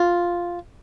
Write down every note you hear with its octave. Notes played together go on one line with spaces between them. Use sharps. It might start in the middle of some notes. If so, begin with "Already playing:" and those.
Already playing: F4